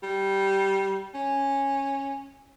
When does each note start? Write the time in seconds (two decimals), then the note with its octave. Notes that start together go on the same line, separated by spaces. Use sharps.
0.03 G3
1.14 C#4